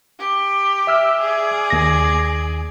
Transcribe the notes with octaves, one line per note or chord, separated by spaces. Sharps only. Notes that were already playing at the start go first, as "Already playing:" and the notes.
G4
E5 E6 F6
G#4 D5
D#2 A#6